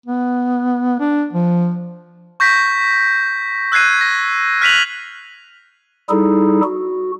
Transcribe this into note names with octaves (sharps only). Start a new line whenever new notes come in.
B3
D4
F3
C#6 G6 A#6 B6
E6 F#6 G#6 C7 D#7
A#6
F6 F#6 B6 D#7 F7 F#7
G3 D#4 E4 G#4 A4
F#4